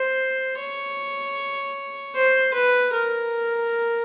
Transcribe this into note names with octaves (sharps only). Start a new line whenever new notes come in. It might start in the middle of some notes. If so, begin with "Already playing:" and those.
Already playing: C5
C#5
C5
B4
A#4